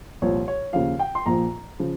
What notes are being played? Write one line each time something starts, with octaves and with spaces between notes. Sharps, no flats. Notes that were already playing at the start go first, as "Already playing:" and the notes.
C2 A#2 F3 C#5
C#5
D#2 C#3 F3 F5
G5
C6
A#1 A#2 F3 A#5
C#3 F3